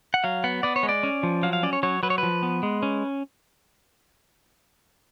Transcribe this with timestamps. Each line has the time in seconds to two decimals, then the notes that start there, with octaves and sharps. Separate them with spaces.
0.14 F#5
0.24 F#3 F5
0.44 B3 F#5
0.63 B3 D5
0.76 C#5
0.83 G#3
0.89 D5
1.03 C#4
1.23 F3
1.43 F#3 F5
1.53 F5
1.63 C#4 D5
1.73 C#5
1.83 F#3 C#5
2.03 F#3 B4
2.10 C#5
2.18 F3 B4
2.43 B3
2.63 G#3
2.83 C#4